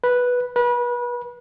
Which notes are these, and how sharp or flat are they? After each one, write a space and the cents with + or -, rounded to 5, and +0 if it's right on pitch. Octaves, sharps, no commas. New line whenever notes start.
B4 -5
B4 -30